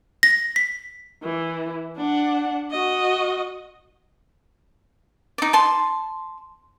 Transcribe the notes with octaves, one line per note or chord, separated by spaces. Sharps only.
A#6
B6
E3
D4 F#5
F#4 D#5
D#4 D5
A5 C6